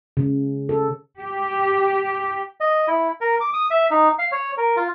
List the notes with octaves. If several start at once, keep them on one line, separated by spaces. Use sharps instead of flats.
C#3
A4
G4
D#5
E4
A#4
D6
D#6
E5
D#4
F5
C#5
A#4
F4